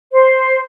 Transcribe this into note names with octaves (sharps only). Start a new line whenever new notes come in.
C5